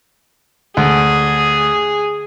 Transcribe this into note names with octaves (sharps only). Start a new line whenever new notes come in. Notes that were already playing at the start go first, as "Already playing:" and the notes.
D2 G#4